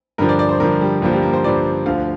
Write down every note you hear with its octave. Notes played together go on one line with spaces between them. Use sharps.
G2 D3 F3 A#4
D5
D5
C5
G2 D3 F3 A#4
G3
G2 D3 F3 A#3
G3
A#3
C5
G2 D3 F3 D5
D2 D3 F3 F5